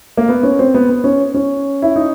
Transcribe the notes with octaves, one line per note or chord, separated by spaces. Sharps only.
A#3
B3
C#4
C4
B3
B3
C#4
C#4
E4
D#4